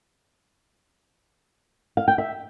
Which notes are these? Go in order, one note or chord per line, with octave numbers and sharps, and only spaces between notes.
F5
G5
E5